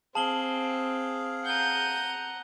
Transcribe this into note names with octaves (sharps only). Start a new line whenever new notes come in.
C4 G#4 F5 A5 F#7 G7
F#5 A#5 G6 D#7